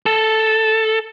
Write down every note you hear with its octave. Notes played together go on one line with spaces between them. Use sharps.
A4